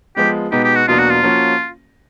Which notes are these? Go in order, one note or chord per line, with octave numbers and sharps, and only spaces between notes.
F3 G#3 B3 G4
B2 G#3 B3 D#4 G4
G4
F#4
E2 B2 F#3 A#3 D4 F4
F#4
F4
F3 A#3 C#4 F#4